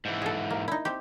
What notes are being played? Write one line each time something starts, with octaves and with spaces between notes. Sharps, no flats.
G#2 E3
G#4 A4
A#3
D#4 E4
C4 G4